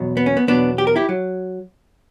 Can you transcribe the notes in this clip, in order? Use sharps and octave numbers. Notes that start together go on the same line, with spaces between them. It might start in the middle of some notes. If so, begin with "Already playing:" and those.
Already playing: E2 B2 F#3
B3
C#4
B3
E2 B2 F#3 B3 D4
G4
A#4
E4 G4
F#3